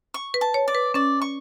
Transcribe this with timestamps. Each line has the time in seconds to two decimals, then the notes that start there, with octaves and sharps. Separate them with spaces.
0.14 C#6
0.34 B4
0.41 A5
0.54 C#5
0.68 D5
0.75 B4
0.94 C#4 D5
1.22 C#6